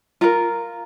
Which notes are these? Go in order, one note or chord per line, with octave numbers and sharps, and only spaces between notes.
F4 A#4 A#5